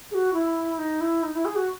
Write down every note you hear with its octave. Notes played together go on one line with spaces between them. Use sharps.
G#4
F#4
E4
D#4
E4
D#4
E4
G#4
F#4